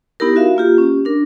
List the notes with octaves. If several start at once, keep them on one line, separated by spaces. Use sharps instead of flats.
B3 D#4 E4 G4 A#4
F#4 E5 F5
A#3 F4 G4
C#4 G4
D4 A#4